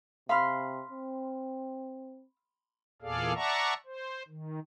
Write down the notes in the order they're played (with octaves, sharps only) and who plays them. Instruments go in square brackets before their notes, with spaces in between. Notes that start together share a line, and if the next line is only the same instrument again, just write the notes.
[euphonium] C3 [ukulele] F5 [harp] B5 C6 F6
[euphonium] C4
[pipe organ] E2 A#2 G#4 A4 D5 F5
D5 E5 F#5 A5 A#5 C#6
C5
D#3